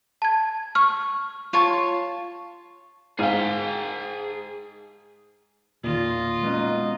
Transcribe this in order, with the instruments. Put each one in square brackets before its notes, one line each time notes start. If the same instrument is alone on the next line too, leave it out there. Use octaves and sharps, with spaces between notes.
[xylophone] A5 G#6
[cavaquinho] C#6 [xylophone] F6
[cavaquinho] F4 C#5 A5
[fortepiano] G#2 F5 [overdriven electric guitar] G#4 G5
[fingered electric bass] E1 D#3 [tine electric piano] A#2 [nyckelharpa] F4 D#5
[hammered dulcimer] B2 D#4 [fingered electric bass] G#3 C4 C#4